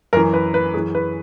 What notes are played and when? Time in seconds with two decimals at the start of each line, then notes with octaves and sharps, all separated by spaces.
0.13 F#2 E3 A#4
0.33 B4
0.54 B4
0.74 F#2 E3 G#4
0.95 B4